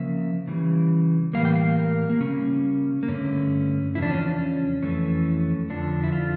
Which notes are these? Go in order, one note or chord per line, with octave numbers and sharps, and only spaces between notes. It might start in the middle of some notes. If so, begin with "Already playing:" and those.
Already playing: C#3 F3 A#3 E5
C#3 E3 G3
A2 E3 G3 A#3 F5
G5
F5
A#4
A#3
C#3 G3 A#3 C#4
A#3
G2 D3 A3 C#4
E2 C#3 F3 E4
D4
C#4
D4
C#4
F2 E3 A3 C#4
F2 D3 F3 D4
E4
F4